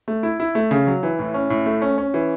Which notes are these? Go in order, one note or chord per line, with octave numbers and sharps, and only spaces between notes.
A3
E4
E4
A3
C#3
F#3
E3
A2
C#4
A2
A3
C#4
C#4
E3